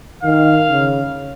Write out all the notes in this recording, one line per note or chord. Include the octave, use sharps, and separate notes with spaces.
D#3 F5
C#3